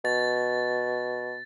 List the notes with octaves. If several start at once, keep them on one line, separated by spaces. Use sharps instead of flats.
B2 A6